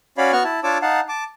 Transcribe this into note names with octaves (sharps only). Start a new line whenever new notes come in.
C#4 F#4 C#5 D5 F5 B5
B3 F#4 F#5 C#6 F6
E4 A5
D4 F4 C#5 A5 D6 E6
D#4 F5 F#5 A5
A5 D6